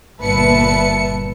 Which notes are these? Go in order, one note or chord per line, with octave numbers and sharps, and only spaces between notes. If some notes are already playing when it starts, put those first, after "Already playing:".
G1 A#2 B4 E5 A5 C#7